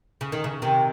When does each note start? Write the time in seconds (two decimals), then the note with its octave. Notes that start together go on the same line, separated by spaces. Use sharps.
0.21 C#3
0.32 D#3
0.44 C#3
0.62 C3 D#3